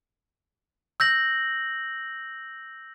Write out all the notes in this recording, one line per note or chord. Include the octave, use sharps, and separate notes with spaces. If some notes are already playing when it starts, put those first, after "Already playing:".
E6 G6 A#6 F#7